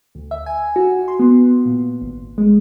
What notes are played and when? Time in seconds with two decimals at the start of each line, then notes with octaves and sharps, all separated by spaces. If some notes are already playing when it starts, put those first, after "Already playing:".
0.15 D2
0.31 E5
0.46 G#5
0.76 F#4
1.08 C6
1.19 B3
1.65 A#2
2.02 G#1
2.38 G#3